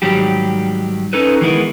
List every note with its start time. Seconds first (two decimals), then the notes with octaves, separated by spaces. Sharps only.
0.02 G#2 D#3 F#3 G3 G4
1.13 C#4 D#4 A4 B4
1.41 D#3 E3 G#3 B3 E4 A#4